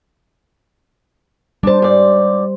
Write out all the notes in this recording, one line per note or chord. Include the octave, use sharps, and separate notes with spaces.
G3 D4 C5 A5
G#2 D5